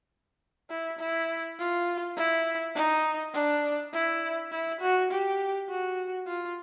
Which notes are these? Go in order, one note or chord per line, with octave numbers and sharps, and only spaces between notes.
E4
E4
F4
E4
D#4
D4
E4
E4
F#4
G4
F#4
F4